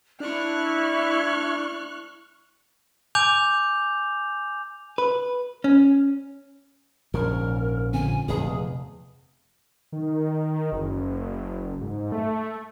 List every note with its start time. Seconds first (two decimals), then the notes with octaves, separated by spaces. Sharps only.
0.20 D4 E4 C#6 F6 F#6
3.15 G#5 D6 G6 F7
4.98 B4
5.64 C#4
7.14 A#1 G#2 C#3 A#4
7.93 A#2 D3 C4 G#5
8.28 F1 E2 G#4
9.92 D#3
10.72 F#1
11.81 G#2
12.12 A3